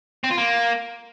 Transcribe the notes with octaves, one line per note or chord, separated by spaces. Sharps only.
C4
F4
A#3